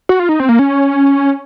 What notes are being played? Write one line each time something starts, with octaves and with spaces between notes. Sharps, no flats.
F#4
F4
D#4
C4
A#3
C#4